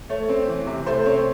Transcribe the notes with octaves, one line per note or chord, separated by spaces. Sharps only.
A3 C#5
C4
E3
C3
A3 C5
C4 C#5